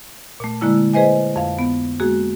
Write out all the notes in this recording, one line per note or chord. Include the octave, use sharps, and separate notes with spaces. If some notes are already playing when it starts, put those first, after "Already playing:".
A#2 A3
D3 G#3 A#3 E4 E6
G#4 B4 C5 D#5 G#5
F2 F5
B3
G#3 A#3 F#4 G#4